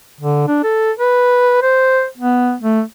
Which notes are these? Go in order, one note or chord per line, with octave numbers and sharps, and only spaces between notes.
D3
D4
A4
B4
C5
B3
A3